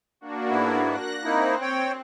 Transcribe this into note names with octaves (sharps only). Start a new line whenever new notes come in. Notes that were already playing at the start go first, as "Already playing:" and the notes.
A#3 D4 F#4
G#2 B3 E4
F#6 A#6
A#3 C4 D#4 E4
C#5 G5